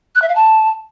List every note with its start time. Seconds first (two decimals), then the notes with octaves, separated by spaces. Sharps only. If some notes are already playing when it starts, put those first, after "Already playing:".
0.15 F#6
0.22 E5
0.29 F5
0.35 A5